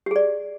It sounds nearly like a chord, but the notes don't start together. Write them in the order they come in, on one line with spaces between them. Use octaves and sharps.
G4 G#4 D5